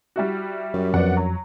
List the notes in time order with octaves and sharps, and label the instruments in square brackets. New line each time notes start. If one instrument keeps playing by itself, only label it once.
[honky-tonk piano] G3 E4 F#4
[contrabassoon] F#2
[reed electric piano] F2 [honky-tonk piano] B3 D5 F#5
[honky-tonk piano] F#3